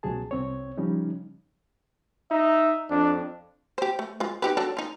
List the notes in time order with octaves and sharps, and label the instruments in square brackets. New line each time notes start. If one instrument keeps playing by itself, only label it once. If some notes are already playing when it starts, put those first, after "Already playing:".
[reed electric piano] C#2 B2 F#3 G#4 A5
C2 C4 C#5
C#3 F3 G3 C#4 D#4
[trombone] D#4 [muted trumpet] E5
[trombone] F2 [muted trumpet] D4
[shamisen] G4 C5
A3
G#3 F4
D#4 G4 B4
F#3 D4 A4
D#4 F4